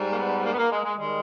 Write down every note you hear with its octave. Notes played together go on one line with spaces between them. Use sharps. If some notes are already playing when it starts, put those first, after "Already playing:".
Already playing: G#2 G3
A#3
B3
A#3
B3
A#3
G#3
G#3
D#3 G3 G#3